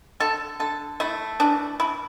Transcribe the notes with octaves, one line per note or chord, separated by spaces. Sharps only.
D3 A4
D3 A4
A3 E4
E3 D4
E3 E4